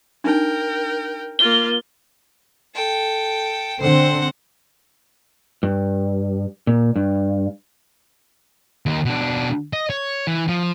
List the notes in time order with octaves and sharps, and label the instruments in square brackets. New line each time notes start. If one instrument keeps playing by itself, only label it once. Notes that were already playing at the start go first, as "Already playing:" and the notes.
[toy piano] D4 D#4 [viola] A#4 G5
[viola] A#3 F4 [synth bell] G7
[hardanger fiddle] A4 G5
[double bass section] D3 C4 [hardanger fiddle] C5 F#5
[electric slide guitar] G2
A#2
G2
[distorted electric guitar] D#2 D#3
B2 D4
D#5
C#5
E3
F3